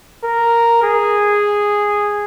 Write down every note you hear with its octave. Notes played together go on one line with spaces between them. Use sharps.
A#4
G#4